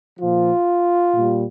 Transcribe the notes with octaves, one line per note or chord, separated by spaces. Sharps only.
A#2 F3 F4
A#2 G3